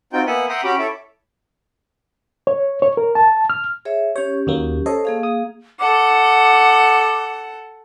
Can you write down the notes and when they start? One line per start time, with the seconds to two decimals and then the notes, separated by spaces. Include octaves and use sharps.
0.13 C4 D#4 F4 F#4 G5
0.27 A#3 B3 E5 F#5 G#5
0.49 E5 F#5 G5 A#5 C6 D#6
0.64 C#4 F#4 G4 B5 D6
0.79 E4 A4 C#5 E5 D6
2.47 C#5
2.82 C#5
2.97 A#4
3.15 A5
3.50 F6
3.85 G#4 C#5 E5
4.16 C#4 G4 C#5
4.47 D#2 F#3 A#3
4.86 A4 C5 C#5 D#5
5.05 A#3 G#4 F5
5.23 D#6
5.80 A4 F#5 D6